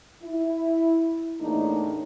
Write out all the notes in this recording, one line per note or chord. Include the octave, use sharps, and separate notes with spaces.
E4
E2 A2 A#3 D4 D#4